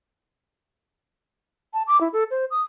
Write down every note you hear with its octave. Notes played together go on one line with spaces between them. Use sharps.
A5
D6
E4
A4
C5
D#6